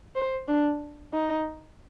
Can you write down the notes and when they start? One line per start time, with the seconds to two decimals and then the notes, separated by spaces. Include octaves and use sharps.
0.15 C5
0.48 D4
1.14 D#4